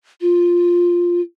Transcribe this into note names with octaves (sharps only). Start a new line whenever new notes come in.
F4